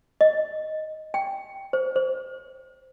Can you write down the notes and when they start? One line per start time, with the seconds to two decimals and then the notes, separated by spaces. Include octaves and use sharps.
0.21 D#5
1.14 G5
1.73 C5
1.96 C5